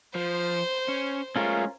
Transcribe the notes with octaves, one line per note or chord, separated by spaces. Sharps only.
F3 C5
C#4
G#3 A3 C#4 F4 A#4